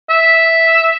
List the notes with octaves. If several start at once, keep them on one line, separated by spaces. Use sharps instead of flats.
E5